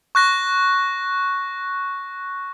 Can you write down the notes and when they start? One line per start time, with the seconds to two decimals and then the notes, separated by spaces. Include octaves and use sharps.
0.15 C#6 F#6 A#6